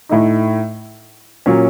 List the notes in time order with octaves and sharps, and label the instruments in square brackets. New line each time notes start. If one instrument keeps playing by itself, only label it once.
[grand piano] A2 A3 D#4
A#2 F#3 A#3 C#4